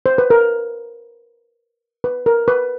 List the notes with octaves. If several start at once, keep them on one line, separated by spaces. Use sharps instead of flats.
C5
B4
A#4
B4
A#4
B4